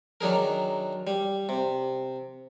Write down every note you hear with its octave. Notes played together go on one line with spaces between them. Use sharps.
D#3 F#3 D4 G#4 A#4
G3
C3